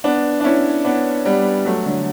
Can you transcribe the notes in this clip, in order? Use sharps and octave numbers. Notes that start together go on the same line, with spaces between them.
B3 D4
D4
C#4 E4
B3 D4
G3 B3
F#3 A3
D3 F#3